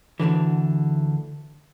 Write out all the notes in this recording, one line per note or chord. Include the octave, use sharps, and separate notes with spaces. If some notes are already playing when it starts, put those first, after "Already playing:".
D2 B2 D3 E3